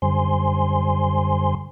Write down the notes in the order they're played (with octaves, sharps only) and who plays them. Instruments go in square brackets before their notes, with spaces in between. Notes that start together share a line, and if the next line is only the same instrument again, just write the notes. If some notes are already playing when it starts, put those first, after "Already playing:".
[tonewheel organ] F#2 D3 G3 C5 G#5 C6